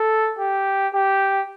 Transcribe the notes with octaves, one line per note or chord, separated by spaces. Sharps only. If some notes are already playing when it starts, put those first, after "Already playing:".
Already playing: A4
G4
G4